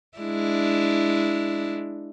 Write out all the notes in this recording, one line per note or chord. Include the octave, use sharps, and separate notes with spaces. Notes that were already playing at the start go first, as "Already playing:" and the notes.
G#3 D4 E4